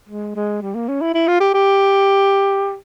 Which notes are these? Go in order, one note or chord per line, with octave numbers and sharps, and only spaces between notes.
G#3
G#3
G3
A#3
C#4
E4
E4
F4
G4
G4